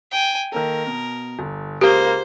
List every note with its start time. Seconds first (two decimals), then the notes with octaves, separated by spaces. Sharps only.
0.11 G5 G#5
0.52 D#3 A#3 A4 A#4
0.86 B2
1.39 G1
1.81 C#2 A#3 G4 C5 G6 G7